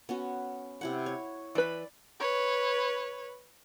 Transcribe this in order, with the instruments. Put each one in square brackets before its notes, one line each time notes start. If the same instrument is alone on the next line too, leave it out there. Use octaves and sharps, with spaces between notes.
[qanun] B3 C#4 F#4
C3 E4 F#5
C#5
[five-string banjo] E3 B4 [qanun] D5 B5
[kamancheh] B4 C#5